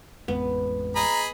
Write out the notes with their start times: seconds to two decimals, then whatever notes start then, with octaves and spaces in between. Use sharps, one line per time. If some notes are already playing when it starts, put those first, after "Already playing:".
0.28 A1 F2 G#3 B3
0.96 G#4 D#5 A#5 B5